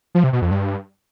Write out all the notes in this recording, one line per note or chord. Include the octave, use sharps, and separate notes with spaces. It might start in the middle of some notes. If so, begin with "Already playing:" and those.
F3
C3
B2
F2
G2